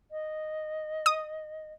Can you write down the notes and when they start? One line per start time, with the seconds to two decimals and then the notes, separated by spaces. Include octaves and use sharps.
0.11 D#5
1.06 D#6